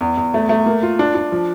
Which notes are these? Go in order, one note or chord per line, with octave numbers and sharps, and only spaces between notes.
E2
E2
A3
A3
A#3
F4
D4
D4
F3